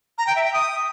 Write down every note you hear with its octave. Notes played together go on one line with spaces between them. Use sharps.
A#5
G5
E5
G5
D#6